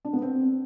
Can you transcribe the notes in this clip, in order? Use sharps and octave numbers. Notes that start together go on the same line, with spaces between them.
D4
B3
C4